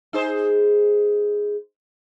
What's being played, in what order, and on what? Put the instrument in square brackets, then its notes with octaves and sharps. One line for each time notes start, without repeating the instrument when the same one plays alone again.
[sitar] D#4 G#4 C5